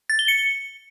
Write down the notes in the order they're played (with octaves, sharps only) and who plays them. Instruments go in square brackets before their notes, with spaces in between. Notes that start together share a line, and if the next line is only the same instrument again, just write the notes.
[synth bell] A6
G7
C#7